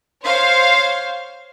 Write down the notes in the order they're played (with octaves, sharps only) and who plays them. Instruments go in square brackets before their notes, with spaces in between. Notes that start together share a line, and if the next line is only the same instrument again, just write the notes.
[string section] C5 C#5 F5